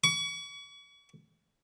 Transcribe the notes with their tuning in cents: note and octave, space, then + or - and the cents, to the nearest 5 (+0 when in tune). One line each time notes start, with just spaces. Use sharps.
C#6 +35